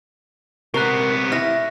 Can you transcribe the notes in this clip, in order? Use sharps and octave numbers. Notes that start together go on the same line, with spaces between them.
C3 B3 A#4 C#6 F#6
E4 F6 A#6